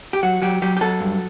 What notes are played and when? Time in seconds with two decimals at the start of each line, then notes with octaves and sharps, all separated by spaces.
0.13 G4
0.23 F#3 F#4
0.42 F#3 G4
0.62 F#3 G4
0.77 G4
0.81 F#3 A4
1.00 G2